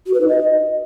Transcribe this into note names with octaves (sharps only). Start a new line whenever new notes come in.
F#4
B4
D#4
D#5